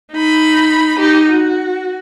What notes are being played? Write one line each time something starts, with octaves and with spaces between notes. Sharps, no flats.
D#4 B5
D#4 G4
F#4